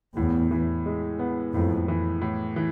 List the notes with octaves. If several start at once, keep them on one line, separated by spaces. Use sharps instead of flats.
E2 A2
E3
G#3
B3
F2 A2
E3
A2
E3